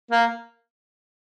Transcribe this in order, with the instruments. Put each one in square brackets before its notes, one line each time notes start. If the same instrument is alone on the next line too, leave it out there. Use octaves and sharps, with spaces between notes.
[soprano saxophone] A#3